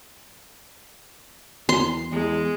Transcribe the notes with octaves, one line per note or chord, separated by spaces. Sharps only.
E2 C6
E2 G#3